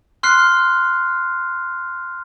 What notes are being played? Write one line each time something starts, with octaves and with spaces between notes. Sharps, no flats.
C6 F6 F#6 C7